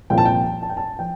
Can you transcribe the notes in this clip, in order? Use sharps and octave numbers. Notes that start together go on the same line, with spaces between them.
C2 A#2 F3 C4 F4 G5
A5
G5
A5
G5
A5
F3 G5